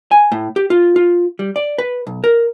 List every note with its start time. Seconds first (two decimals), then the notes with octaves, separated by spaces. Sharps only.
0.11 G#5
0.32 A2
0.56 G4
0.70 F4
0.96 F4
1.39 G3
1.56 D5
1.78 B4
2.07 B1
2.24 A#4